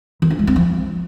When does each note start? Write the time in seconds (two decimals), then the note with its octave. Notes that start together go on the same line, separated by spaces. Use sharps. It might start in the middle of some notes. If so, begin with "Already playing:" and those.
0.22 D#3
0.31 D4
0.39 G#3
0.47 C4
0.56 F3